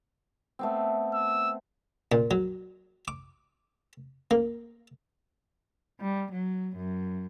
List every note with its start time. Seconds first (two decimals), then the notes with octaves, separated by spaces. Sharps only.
0.59 A3 B3 C4
1.14 E6
2.12 A#2
2.31 F#3
3.08 D6
4.31 A#3
6.00 G3
6.32 F#3
6.77 F#2